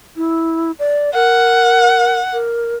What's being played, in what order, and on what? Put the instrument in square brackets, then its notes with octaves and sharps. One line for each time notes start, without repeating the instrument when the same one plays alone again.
[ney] E4
D5
[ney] A#4 [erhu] F#5
[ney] A#4